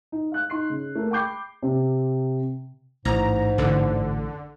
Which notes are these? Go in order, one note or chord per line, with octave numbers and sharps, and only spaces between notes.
D#4
F5 F#6
D#4 C6 C7
C#3
A3 A#3
G5 B5 D6 G6 C7
C3
A1 G#2 A#5
A1 F#2 D3